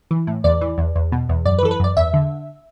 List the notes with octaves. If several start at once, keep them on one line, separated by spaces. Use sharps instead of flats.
E3
A2
E2 D5
E3
E2
E2
B2
E2
F#2 D5
B4
E3 A4
B4
F#2 D5
E2 E5
D3